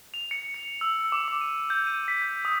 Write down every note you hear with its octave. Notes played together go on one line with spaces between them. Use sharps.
F7
C#7
C#7
E6
D6
D6
D#7
G6
D#7
B6
G6
D#6